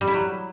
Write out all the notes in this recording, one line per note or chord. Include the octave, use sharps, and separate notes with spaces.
G3
E4
F#3